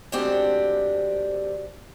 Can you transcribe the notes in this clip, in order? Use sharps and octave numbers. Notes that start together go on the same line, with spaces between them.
D2 G#3 C4 D4 G4 F#5